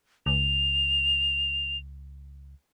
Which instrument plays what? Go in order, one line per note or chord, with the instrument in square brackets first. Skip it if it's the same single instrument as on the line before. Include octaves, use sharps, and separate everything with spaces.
[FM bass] C#2 [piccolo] F7